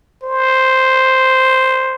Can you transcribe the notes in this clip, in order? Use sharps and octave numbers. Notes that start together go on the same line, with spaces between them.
C5